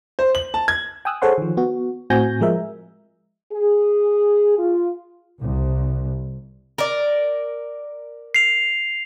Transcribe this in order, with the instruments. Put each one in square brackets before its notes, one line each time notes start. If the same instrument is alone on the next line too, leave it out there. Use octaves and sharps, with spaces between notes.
[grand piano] C5
F#7
A5
G#6
[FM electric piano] G5 G#5 D#6 E6 F#6
G#4 A4 C5 C#5 F#5 C6
D#3 F3
B3 F#4
A2 C4 F#4 G#5 G6 A#6
F3 G#3 A#4 E5
[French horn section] G#4
F4
[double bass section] C2
[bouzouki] A#4 D5
[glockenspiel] C7 F7